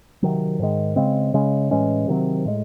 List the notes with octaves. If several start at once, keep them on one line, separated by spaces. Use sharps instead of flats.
C3 D#3 F#3
G#2 D#3 G#3
C#3 G#3 C4
C#3 G#3 C#4
A2 E3 G#3 C#4
C3 D#3 F#3 C4
A2 G#3